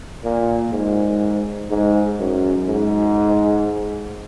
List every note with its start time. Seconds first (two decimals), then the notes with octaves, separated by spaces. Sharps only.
0.24 A#2
0.72 G#2
1.70 G#2
2.19 F#2
2.68 G#2